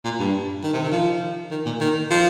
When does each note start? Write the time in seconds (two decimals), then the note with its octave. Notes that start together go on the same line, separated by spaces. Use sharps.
0.04 A#2
0.19 G2
0.63 D#3
0.73 C3
0.83 D#3
0.92 F3
1.51 D#3
1.66 A#2
1.80 D#3
2.10 F3